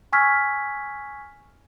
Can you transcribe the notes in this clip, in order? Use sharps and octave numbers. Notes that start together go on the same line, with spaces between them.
G#5 C#6 E6 F6 G#6 B6